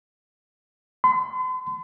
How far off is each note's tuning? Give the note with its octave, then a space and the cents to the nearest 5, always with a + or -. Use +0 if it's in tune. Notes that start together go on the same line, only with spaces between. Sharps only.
C6 -45